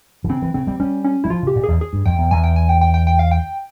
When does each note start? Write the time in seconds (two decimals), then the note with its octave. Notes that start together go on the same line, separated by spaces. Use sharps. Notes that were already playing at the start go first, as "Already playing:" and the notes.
0.24 E3
0.29 C#3 C4
0.42 E3
0.54 C#3 C4
0.67 G3
0.80 G3 C#4
1.04 C#4
1.24 G3 E4
1.30 F3 F4
1.43 C#3
1.47 G4
1.56 A#2
1.64 E2 G#4
1.81 G#4
1.93 G2
2.06 F2 G5
2.19 E2
2.31 E2 G#5
2.44 G5
2.56 G#5
2.69 G5
2.81 G5
2.94 G5
3.07 G5
3.19 F5
3.31 G5